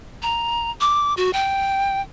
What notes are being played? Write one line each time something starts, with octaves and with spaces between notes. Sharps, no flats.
A#5
D6
F#4
G5